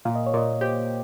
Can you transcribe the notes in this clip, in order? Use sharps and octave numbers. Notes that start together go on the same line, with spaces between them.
A#2 F5
D#5
C#5
A#2 D#5
G4 C5